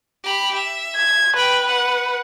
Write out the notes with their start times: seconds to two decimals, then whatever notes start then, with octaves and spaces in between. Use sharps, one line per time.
0.24 G4 B5
0.55 E5
0.96 G#6
1.36 B4 G5 B5
1.67 F#5